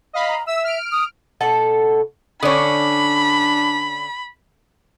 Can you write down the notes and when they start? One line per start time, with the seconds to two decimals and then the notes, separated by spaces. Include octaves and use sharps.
0.13 D#5 F5 B5
0.28 A#5
0.47 E5 E6
0.64 F6 D7
0.92 D#6
1.41 B2 A4 F#5
2.43 D3 C#4 D4 C#5 D5 B5 D#6